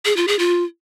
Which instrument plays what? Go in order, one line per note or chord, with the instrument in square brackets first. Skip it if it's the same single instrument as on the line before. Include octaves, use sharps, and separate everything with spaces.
[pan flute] G#4
F4
G#4
F4